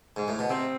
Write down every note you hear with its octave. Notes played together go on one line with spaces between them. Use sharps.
G#2
A2
B2
C3 C4